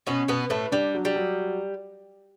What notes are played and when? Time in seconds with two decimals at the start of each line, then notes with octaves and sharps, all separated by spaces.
0.07 B2 B3 C#4
0.28 B2 B3 B4
0.50 A2 A3 B4
0.72 G3 D4
0.94 F#3
1.05 G3
1.16 F#3